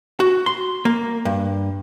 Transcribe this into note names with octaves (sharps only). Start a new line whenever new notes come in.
F#4
C6
A#3
G2